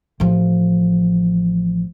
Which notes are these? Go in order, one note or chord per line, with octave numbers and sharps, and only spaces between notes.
A1 F3